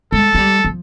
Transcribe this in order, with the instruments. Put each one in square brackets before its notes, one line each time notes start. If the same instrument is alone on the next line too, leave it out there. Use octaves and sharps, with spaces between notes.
[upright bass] G#3 [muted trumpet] A4
[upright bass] G#3
G3
F3